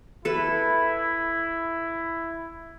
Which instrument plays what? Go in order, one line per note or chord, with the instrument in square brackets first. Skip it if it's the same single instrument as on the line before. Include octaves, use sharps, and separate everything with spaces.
[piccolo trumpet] E4 [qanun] A4 B4